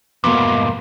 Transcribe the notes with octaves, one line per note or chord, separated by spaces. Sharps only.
C2 F2 G#2 B2 A#3 B3 D6